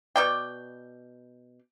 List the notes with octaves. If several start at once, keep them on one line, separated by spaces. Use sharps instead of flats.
B2 D5 G5